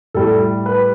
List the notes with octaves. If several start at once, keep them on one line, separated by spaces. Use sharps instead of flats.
A2 G3 A4
B4